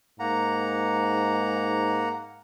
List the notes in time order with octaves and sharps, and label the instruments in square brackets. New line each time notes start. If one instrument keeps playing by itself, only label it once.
[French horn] G#2 [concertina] A#3 F#5 A#5